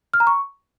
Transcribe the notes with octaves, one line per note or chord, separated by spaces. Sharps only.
F6
A#5
C#6